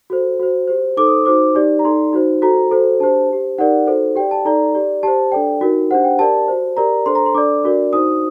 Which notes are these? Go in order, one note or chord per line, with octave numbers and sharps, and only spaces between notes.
F#4 A4 C5
F#4 C5
G4 C5
D#4 A4 C5 D6
D#6
D#4 F#4 C5 D6
D#4 G4 D5
A#5
D#4 A4 D5 C6
D#4 F#4 C5
F#4 A4 C5 A#5
F#4 A4 C5
D4 G4 C5 A5
G4 C5
D#4 G4 A#4 D5 F#5
D#4 F#4 A4 C5
G4 D5 G5
A5
D#4 A4 D5 A#5
G4 D5
G4 C5 A5
D4 A4 D5 G5
D#4 F#4 A#4
D4 G4 C5 F#5
G5
G4 A#4 D5 A5
F#4 C5
G4 A#4 D5 A#5
D4 A4 C5 C6
A#5
C6
D4 A4 D5 D6
D4 F#4 A#4 D5
D#4 F#4 C5 D#6